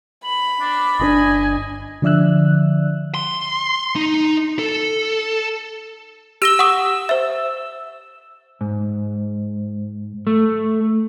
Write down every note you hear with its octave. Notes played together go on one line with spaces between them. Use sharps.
B5 F#7
D4 D6
G1 C3 D4 D#5 G#5
D3 F3 D5 E5 E6 F#6
C6
D#4
A4
G4 E6 A#6 G7
F#5 C#6 D#6
C5 E5
G#2
A3